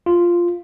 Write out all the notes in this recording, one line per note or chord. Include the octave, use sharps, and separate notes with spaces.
F4